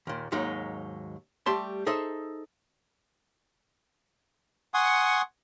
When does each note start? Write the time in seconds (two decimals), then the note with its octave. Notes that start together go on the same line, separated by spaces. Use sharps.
0.07 D#2 A#2
0.32 D#2 G#2 F#3 G#3 D#4
1.46 G3 A3 G4 A5 C6
1.86 D#4 G#4 A4 C5 E5
4.74 F#5 G#5 C6 C#6 D#6